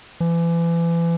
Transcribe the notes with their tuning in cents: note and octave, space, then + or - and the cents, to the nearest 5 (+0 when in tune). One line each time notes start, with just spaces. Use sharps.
E3 +35